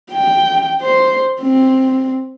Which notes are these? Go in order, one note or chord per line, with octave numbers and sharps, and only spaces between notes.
G5
C5
C4